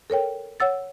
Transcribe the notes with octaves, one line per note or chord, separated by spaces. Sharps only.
A4 A#4 C#5 G5
C#5 F#5 E6 A6